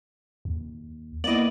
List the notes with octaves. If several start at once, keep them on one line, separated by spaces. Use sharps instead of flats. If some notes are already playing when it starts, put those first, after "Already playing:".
D#2
A#3 B3 E4 D5 D#5 F#7